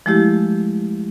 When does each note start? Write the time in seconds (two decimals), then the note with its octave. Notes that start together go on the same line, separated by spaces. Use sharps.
0.06 F3 G#3 A3 E4 G4